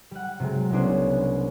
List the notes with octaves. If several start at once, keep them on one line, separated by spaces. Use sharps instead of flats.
G3 F#5
C3 F#3 G#3
C2 G#3 B3 C#4 D4 C5